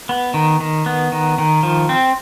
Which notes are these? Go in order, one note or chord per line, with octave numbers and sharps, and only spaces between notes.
B3
D#3
D#3
B3
D#3
D#3
F3
C4